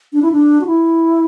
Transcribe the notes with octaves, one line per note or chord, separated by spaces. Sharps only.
D4
E4
D4
F#4
E4